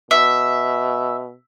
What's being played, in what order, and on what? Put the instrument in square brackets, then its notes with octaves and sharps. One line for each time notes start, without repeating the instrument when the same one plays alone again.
[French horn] B2 [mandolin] E5